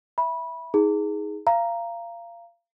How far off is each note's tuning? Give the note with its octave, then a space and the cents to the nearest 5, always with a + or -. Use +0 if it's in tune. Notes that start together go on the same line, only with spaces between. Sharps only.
E5 +0 B5 -20
D#4 +30 G#4 +0 A#5 -45
F5 -25 A#5 +0